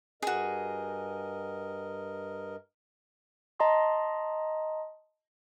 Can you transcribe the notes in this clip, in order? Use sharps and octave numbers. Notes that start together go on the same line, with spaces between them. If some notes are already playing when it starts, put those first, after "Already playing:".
G2 F#4 G#4 A#4 D#5
D#5 A5 A#5 C6 D#6